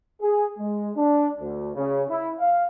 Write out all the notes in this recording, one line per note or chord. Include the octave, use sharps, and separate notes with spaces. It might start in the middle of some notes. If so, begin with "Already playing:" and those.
G#4
G#3
D4
D2
C#3
E4
F5